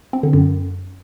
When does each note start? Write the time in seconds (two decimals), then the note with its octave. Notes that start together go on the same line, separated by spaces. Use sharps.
0.13 C4
0.23 D3
0.33 F#2